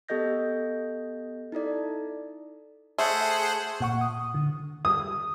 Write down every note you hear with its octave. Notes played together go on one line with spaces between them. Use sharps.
B3 G4 A4 D#5 G6 A#6
D#4 E4 A4 D5
A3 G#4 C5 F#5
A#2 F#5 C#6
D#6
D3
D#6